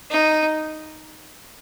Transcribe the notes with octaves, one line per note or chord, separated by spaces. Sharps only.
D#4